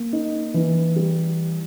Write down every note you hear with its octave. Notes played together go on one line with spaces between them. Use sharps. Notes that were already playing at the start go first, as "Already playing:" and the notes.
Already playing: A#3
D#4
E3
G3